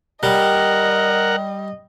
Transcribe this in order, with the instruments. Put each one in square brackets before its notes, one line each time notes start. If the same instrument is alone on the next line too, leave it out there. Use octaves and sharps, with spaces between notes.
[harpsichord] G3 [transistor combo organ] A#4 F#5 [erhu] D#5